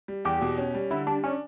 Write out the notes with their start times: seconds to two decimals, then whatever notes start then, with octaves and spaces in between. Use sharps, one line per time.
0.08 G3
0.25 E2 G4
0.41 B2
0.58 C#4
0.75 G3
0.90 D3 E4
1.07 G3 D4
1.24 C#4 D4